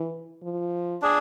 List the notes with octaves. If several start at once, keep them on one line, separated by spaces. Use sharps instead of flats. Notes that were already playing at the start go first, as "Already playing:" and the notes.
Already playing: E3
F3
D4 G#4